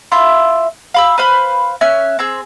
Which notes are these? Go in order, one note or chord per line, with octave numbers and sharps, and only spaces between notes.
E4 F4 E5 C6
F5 B5 E6
B4 C5 F5 B5
C#4 E5 G#5 F#6
C4 G#4 E6